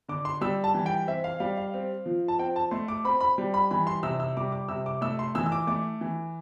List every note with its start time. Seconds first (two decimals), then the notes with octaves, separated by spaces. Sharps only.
0.08 D3 D6
0.25 C6
0.41 G3 E6
0.64 A5
0.74 E3
0.86 G5
1.07 C4 E5
1.24 F5
1.40 G3 F5
1.57 F5
1.74 C4
2.06 F3
2.28 A5
2.39 C4 G5
2.56 A5
2.71 A3 C6
2.88 D6
3.04 C4 B5
3.21 B5
3.38 G3
3.54 B5
3.71 E3 B5
3.87 C6
4.03 C3 E6
4.20 E6
4.37 G3 D6
4.52 D6
4.68 C3 E6
4.86 D6
5.01 A3 E6
5.19 C6
5.35 E3 E6
5.46 E6
5.52 D6
5.67 A3 D6
6.01 E3